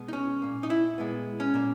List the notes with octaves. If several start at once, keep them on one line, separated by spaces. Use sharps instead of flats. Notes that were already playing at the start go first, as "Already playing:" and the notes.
Already playing: B2 G#3 B3
D#4
C#4
A#2 A#3
D#4
E4
A#2 G#3 B3
C#4
A#2 A#3